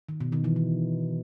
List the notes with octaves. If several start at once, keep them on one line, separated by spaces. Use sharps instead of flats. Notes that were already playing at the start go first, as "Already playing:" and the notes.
D#3
B2
D#3
E3
D#3